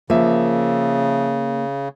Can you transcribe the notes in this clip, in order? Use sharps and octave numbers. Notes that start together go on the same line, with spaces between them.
C#3 F3 A#3 E5